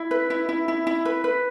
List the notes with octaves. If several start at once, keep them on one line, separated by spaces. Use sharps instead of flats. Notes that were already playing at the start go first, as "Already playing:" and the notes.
Already playing: E4
B4
E4
E4
E4
E4
B4
B4